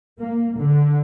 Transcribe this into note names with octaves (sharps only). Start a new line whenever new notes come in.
A#3
D3